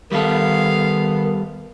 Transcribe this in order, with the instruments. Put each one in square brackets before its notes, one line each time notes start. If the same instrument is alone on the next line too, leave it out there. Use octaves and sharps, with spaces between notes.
[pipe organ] D#3 [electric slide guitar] G3 A4 [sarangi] B3 [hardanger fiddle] F5